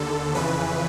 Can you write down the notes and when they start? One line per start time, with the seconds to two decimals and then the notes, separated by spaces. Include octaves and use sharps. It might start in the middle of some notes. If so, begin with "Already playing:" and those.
Already playing: D#2 D3 A4
0.35 F2 C#3 E3 B4